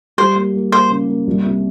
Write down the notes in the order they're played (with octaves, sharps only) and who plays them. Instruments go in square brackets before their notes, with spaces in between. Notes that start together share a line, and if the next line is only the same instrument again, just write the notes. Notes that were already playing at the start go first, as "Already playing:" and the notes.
[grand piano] G3 [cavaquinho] C5
[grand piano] A#3
A#3
[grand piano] A#3 [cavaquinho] C5
[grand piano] C#3
A#3
C2
C3